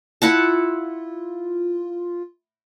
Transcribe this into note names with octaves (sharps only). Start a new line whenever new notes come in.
E4 F4 F#5 A5